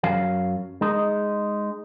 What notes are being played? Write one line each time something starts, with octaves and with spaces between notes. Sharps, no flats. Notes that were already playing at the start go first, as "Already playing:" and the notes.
F#2 F#3 F5
G#3 D#4